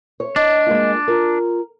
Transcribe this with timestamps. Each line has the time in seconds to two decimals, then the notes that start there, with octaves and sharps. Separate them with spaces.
0.20 C#5
0.36 D4 D#5
0.66 G#3 A#3 F4
1.08 F4 A#4